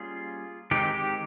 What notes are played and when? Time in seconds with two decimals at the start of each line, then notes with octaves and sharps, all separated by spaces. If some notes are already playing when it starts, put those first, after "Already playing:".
Already playing: G3 A#3 C#4 F4 G#4
0.71 D#3 G#3 C4 D#4 G4
0.94 G4